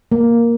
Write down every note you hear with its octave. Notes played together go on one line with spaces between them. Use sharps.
A#3